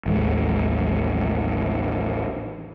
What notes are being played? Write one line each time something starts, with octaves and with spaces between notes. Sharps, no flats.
A1 D#2 G#3